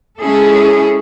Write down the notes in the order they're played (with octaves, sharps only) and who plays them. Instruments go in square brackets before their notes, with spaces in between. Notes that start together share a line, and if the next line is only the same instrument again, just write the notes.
[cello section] G#3 C#4 E4 G#4 A4